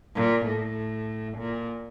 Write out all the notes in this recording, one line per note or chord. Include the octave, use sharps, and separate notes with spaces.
A#2
A2
A#2